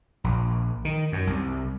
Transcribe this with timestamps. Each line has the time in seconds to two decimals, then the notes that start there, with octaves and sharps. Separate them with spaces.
0.24 A#1
0.85 D#3
1.12 F#2
1.27 C2